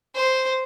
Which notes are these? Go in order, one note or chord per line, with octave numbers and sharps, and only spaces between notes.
C5